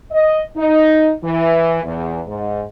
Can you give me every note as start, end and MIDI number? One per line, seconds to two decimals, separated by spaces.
0.11 0.41 75
0.56 1.10 63
1.23 1.81 52
1.83 2.20 40
2.27 2.62 44